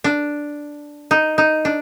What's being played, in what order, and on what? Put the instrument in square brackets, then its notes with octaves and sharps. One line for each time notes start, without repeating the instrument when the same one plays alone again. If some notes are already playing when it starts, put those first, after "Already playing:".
[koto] D4
D#4
D#4
D4